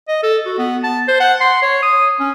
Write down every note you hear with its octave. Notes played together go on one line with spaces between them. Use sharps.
D#5
A4
F#4
B3
A5
C5
F#5
C6
C#5
D#6
C#4